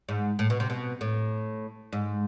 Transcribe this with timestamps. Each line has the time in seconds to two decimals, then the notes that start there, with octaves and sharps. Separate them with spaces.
0.09 G#2
0.39 A2
0.50 B2
0.60 C3
0.70 B2
1.01 A2
1.93 G#2